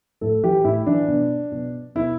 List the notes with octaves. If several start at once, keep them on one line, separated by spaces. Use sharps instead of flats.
A2 A4
E3 G4
A2 E4
E3 D4
B2
B2
B2 E4